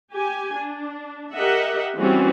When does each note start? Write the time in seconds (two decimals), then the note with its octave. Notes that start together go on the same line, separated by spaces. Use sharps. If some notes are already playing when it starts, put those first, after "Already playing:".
0.13 G4 G#5
0.56 D4
1.33 G4 A#4 D#5 E5 F#5
1.97 E3 G3 C4 C#4 F#4